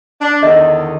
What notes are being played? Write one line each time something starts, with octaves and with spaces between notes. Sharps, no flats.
D4
E2 D3 D#3 D#5